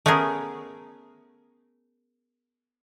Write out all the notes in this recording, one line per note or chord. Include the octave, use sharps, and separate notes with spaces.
A3 B3 C#4 G#4 A#4